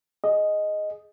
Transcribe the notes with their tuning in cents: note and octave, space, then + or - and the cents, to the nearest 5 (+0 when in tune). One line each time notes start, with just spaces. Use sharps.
G#4 +0 D#5 +0